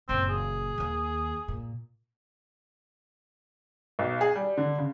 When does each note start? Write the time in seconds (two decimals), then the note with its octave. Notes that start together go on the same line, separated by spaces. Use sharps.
0.09 F#1 A#2 C4
0.29 G#4
0.78 D#2 A#3
1.48 A#2
3.99 B1
4.21 G#4
4.36 G3
4.57 D3
4.78 C#3